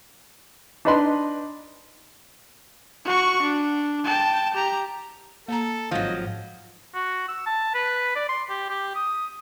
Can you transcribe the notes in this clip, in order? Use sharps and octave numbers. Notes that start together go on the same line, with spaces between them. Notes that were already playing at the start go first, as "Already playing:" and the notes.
D4 D#4 B4 D#5 B5 C6
F#4 C#6
D4
G5 A5
G4 A#5
A#3 A4 A#5
G#1 G#2 F3 F#3 D#5
F#4
E6
A5
B4
D5
C6
G4
G4
D#6